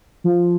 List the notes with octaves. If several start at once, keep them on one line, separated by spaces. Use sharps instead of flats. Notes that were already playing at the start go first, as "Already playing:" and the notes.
F3